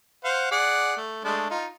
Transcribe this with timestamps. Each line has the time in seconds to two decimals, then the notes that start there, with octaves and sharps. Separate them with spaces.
0.24 C5 F5 F#5
0.51 G#4 D5 F#5
0.96 A3
1.24 G#3 A3 D4
1.50 D#4 F4